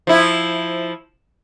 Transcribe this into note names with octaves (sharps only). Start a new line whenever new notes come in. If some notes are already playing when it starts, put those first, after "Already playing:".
F3 E4